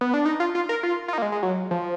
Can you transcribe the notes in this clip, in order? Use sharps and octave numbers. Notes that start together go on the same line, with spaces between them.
B3
D4
D#4
F4
F4
A#4
F4
F4
D#4
A#3
G#3
G#3
F#3
F3